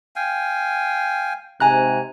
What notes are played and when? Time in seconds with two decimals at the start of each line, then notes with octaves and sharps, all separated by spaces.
0.16 F5 G5 G#5
1.60 G#2 C3 G#5 A#5 F#6